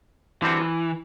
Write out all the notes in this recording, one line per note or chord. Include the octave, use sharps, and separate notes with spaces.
D3 E3 G3 C4 F#4